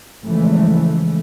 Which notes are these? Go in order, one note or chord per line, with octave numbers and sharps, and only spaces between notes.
C#3 E3 F3 G#3 A3